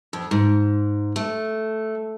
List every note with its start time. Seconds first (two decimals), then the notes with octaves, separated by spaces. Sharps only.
0.13 F2
0.31 G#2
1.16 A3